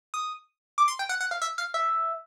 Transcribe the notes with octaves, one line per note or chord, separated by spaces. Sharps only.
D#6
D6
C6
G5
F#5
F#5
F5
E5
F5
E5